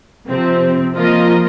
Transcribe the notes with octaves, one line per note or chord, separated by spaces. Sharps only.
C3 F3 C4
F3 A#3 F4 A#4 D#5